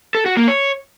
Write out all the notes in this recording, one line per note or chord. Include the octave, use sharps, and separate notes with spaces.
A4
F#4
A#3
C#5